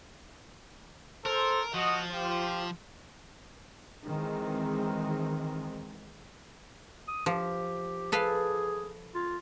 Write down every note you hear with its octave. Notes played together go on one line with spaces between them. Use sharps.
A4 A#4 C5
F3 F#4 D#5
F4 G4 C5
D#3 E3 G#3 C4
D#6
F3 G4
G#4 A4 B4 F5
F4